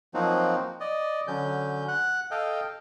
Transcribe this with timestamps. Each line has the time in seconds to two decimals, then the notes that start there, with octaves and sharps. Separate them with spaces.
0.14 F3 F#3 A#3 C4 D#4 F#4
0.80 D5 D#5
1.28 D3 F#3 C#4 G6
1.88 F#5 F#6
2.31 A4 D#5 F5 G5